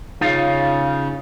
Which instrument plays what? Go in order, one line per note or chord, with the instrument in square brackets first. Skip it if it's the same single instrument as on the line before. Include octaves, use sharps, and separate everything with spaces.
[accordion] C#3 [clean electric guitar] D#4 F4 F5